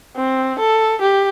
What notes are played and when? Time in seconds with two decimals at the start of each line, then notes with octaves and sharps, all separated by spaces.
0.16 C4
0.59 A4
1.01 G4